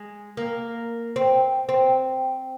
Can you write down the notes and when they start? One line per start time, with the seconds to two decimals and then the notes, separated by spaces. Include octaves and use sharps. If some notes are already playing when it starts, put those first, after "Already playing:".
Already playing: G#3
0.37 A#3
1.16 C4
1.69 C4